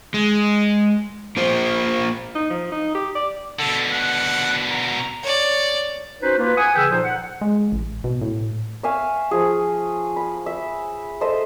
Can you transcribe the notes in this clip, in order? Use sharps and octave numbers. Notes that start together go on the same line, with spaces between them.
G#3
A#3 F4 C5
D#4
F3
D#4
G4
D5
B2 D3 A4
F#5
A#5
C#5 D5
C#4 D#4 F#4 B4 C5
A#3 F4 B4
F#5 G#5 D#6
C#3 E3 G#4 B4 G5 E6
A#2 F3 D#4 A4 C5
F#5
G#3
A1
B2
A2
C#5 E5 F5 G#5
F3 G#4
B5
E5
A4 C5 D#5 E5